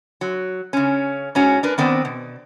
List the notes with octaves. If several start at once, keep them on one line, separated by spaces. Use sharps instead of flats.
F#3
C#3 C#4
G#2 C#4 F#4
D4 A#4 B4
D#3 B3 C4 D5
B2